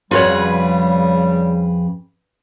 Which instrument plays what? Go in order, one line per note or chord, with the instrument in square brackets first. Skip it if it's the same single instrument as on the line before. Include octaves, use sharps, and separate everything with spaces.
[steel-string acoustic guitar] F2 G#4 B4 [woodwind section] C#3 G3 [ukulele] F4 F#4 C#5